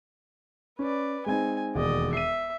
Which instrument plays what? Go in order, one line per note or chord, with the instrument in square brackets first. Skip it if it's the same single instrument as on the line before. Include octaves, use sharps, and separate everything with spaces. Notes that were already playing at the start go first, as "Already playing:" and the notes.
[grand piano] C#4 [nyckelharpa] B4 D5
[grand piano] G#3 C4 D#4 [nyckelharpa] G#5
[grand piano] E1 D#2 [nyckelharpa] D5 D#5
[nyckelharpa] E5 [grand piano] C7 D#7